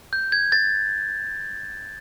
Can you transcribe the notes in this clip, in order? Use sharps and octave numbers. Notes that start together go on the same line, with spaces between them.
G6
G#6
A6